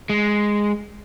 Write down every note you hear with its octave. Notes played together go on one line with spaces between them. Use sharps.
G#3